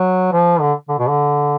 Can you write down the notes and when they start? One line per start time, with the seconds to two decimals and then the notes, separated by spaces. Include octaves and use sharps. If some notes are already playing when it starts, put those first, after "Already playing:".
Already playing: F#3
0.32 F3
0.61 D3
0.89 D3
0.99 B2
1.08 D3